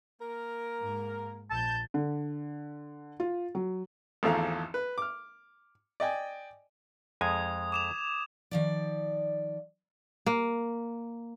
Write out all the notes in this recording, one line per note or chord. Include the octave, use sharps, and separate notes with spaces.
A#3 A#4
G#2
A#1 A5 G6
D3
F4
F#3
G#1 E2 F3 A3 F5 A#5
B4
D6 F6
D5 D#5 G5 G#5
F2 G#3 G#5 D#6 G#6
D6 E7 F7
D#3 F3 D5
A#3